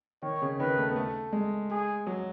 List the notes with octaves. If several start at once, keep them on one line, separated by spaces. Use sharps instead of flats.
D#3 C#5
C#3
D#3 B4
A3
B3
A3
G#3
G#4
F#3